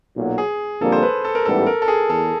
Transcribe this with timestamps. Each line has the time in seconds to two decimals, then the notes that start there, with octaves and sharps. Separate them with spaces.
0.17 B1 A#2 F#3
0.38 G#4
0.81 F2 D3 G3 A#3 A4
0.92 C5
1.03 B4
1.25 A4
1.35 A#4
1.45 A1 G#2 E3 G3 B3 A4
1.66 A#4
1.82 A4
1.88 G#4
2.10 E2 A4